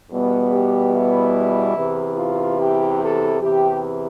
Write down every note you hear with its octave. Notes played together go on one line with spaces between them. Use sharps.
E2 B2 G3 B3
G4
E4
E2 C3 E3
F4
G4
A4
E2 C3 E3 G4